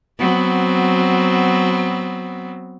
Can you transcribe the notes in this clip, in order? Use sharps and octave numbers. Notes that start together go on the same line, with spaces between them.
F#3 B3 C4